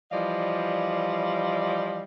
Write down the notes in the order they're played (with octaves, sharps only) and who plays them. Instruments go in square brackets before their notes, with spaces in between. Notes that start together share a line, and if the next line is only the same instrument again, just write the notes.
[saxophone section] E3 F3 G3 D5 D#5 F5